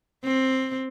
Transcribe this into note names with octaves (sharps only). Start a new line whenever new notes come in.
C4